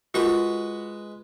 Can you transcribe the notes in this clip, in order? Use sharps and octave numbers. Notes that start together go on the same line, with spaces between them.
G#3 F4 F#4 A#4 B4